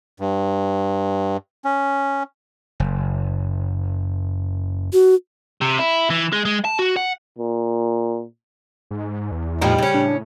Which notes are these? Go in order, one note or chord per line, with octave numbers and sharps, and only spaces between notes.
G2
C#4
F#1
F#4
C3
E4
E3
G#3
G#3
A5
F#4
F#5
A#2
G#2
E2
A2 F3 G3 C4 D#4
C#3 C#4
A2 D4